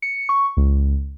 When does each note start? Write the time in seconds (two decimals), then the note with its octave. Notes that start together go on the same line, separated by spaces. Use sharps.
0.02 C#7
0.29 C#6
0.57 C#2